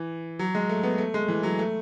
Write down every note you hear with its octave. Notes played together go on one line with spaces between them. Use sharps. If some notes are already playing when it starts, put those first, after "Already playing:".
Already playing: E3
F#3
G#3
A3
B3
A3
G#3
E3
F#3
A3